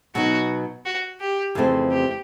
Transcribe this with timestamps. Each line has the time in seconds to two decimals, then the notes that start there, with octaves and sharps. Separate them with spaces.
0.15 B2 F#3 B3 D#4 F#4
0.85 F#4
1.20 G4
1.55 F2 C#3 E3 A3 C4
1.91 G4